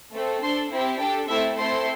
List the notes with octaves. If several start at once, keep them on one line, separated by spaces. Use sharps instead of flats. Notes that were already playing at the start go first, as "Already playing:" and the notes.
A3 C4 A4
D4 A4 C5 C6
C4 E4 G4
D4 G4 A4 G5
A3 C4 E4 A4 E5
A3 C4 E4 A4 C5 C6